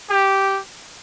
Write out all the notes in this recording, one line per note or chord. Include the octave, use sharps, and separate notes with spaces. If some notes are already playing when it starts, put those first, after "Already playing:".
G4